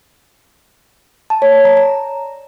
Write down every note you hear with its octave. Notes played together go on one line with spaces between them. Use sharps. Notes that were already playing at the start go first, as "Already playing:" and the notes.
A5
C#5
D5
A#5
A#5